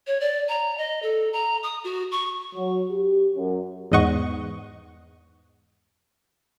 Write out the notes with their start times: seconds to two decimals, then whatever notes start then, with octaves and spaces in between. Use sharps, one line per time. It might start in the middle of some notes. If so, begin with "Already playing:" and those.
0.07 C#5
0.20 D5
0.48 A#5
0.77 D#5
1.02 A4
1.33 A#5
1.63 D#6
1.84 F#4
2.11 C#6
2.54 F#3
2.90 G4
3.36 F#2
3.92 E2 G#2 D#5 F#5 C#6